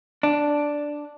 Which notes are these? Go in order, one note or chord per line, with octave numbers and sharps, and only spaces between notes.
D4